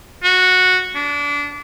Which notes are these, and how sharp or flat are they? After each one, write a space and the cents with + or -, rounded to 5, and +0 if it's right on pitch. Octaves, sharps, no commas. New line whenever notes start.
F#4 -10
D4 -25